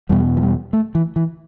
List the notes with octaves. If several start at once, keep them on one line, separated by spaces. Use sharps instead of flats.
E2 B2 G3
F3
G3
A3
E3
E3